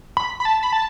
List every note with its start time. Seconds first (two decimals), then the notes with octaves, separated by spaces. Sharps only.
0.17 B5
0.40 B5
0.45 A5
0.63 B5
0.73 A5